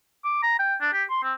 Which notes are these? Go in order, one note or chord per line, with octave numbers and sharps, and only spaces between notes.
D6
A#5
G5
D4
G4
C6
C4